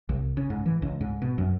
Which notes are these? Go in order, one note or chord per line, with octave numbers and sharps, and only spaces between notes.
C2
C#3
G#2
E3
C#2
G#2
B2
F#2